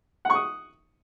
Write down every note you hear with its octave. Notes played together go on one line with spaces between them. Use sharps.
F#5 C#6 D#6